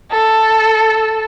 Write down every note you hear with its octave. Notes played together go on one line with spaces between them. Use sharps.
A4